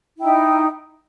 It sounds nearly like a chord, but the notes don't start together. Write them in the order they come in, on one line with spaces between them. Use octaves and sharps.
E4 G5 D#4